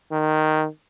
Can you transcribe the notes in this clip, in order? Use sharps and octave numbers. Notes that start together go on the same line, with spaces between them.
D#3